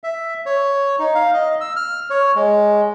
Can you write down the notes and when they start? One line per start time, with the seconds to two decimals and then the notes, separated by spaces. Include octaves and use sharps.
0.04 E5
0.46 C#5
0.99 D#4
1.15 F5
1.34 D#5
1.61 E6
1.76 F6
2.10 C#5
2.35 G#3